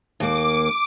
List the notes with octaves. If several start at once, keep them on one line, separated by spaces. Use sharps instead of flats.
D#2 A#3 D6